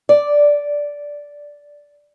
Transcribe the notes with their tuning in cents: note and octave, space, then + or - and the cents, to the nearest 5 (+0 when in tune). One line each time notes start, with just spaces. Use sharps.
D5 -10